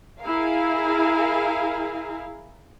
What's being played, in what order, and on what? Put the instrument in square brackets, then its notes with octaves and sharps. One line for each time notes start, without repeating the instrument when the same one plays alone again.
[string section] E4 G#4 A#4 F5